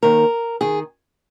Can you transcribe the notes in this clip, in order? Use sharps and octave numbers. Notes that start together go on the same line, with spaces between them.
D#2 D#3 A#4
D#3 G#4